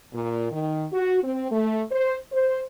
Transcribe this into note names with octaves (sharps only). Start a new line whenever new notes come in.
A#2
D#3
F#4
C4
A3
C5
C5